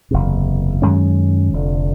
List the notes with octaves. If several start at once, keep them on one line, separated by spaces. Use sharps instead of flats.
F#1 E2 C3
F#2 D#3 G#3 C#4
F1 F2 D3